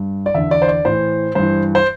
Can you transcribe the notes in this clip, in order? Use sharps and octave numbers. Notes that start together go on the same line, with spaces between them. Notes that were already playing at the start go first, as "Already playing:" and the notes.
Already playing: G2
D5
E2 D3 E5
D5
C5
D5
A2 E3 C5
G2 E3 C5
C5